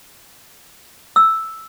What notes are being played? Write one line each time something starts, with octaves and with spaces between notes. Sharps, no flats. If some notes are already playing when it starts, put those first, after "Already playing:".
E6